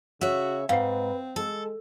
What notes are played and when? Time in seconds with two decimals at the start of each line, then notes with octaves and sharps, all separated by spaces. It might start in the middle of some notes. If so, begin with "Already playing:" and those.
0.21 C#3 F#4 C#5 E5
0.69 G#2 C4 B4 F5 F#5
1.36 G#3 A4